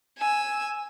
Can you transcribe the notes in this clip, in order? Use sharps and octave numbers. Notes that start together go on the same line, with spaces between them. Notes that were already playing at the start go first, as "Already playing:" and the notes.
G#5 E6